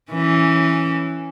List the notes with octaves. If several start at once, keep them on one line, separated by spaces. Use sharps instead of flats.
E3 C#4